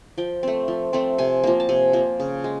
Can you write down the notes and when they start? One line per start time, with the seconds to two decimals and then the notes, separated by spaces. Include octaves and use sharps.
0.18 F3 G5
0.43 A3 C4
0.68 F3
0.93 A3 C4
1.18 C3 G#5
1.44 F3 A#3
1.60 A5
1.69 C3 G#5
1.93 F3 A#3
2.20 C#3
2.44 G#3